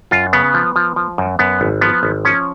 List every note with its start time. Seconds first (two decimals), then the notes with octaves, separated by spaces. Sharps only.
0.11 F#2 F4
0.33 C#3 B3
0.54 F3
0.76 F3
0.96 F3
1.18 F#2
1.39 F#2 B3
1.61 G#1
1.81 F3 B3
2.03 G#1
2.25 F3 C#4